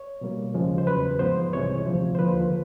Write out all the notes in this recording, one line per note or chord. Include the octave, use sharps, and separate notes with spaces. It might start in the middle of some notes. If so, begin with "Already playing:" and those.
Already playing: C#5
B2 G3 A#3
D#2 C#3 F3 G#3
C5
E2 C#3 F#3 B4
G#2 F3 G#3 B3 C5
C2 C3 E3 G#3 C#5
D2 C3 F3
C5
D#2 D3 F3 A#3 B4